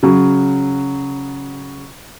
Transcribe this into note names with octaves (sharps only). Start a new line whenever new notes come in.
C#3 F#3